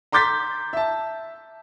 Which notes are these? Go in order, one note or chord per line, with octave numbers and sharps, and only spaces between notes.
A#5 C6 D6 G6 A6 B6
E5 A5